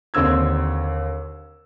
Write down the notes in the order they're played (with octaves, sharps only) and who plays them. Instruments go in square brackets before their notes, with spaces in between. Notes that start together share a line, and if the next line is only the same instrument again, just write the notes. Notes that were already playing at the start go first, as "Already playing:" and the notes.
[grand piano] D#2 D3 C4 E6 G#6